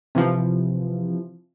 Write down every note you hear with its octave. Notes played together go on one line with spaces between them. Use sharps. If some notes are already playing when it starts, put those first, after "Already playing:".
C3 E3 F3